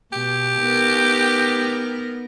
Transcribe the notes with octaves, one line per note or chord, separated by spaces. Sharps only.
B2 G4
B3 D#4 A#4